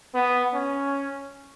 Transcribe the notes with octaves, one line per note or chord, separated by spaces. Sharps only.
B3
C#4